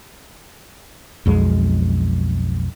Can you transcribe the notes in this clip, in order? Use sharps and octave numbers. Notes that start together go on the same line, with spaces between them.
B1 F2 G#3